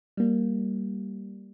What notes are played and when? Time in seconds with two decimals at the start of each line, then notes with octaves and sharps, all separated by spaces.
0.17 G3 A#3